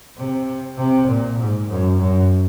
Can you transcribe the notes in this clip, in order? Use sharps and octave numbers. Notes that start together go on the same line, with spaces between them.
C3
C3
A#2
G#2
F#2
F#2